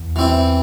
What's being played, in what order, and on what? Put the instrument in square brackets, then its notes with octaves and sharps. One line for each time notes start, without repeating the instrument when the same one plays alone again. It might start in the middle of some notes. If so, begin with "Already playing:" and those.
Already playing: [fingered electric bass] E2
[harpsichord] E3 C4 E4